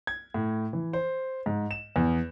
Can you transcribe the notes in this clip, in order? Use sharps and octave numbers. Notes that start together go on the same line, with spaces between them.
G#6
A2
E3
C5
G#2
E7
E2